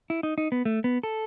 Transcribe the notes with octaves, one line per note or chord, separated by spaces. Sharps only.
E4
D#4
D#4
B3
A3
B3
A4